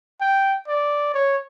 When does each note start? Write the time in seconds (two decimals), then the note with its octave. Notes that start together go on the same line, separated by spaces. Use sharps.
0.21 G5
0.68 D5
1.14 C#5